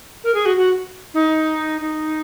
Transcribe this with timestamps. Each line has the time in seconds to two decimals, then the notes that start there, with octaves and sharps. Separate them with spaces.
0.24 A#4
0.34 G#4
0.46 F#4
0.57 F#4
1.14 D#4
1.81 D#4